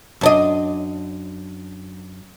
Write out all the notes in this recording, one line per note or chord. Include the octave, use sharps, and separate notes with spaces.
F#2 D4 D#5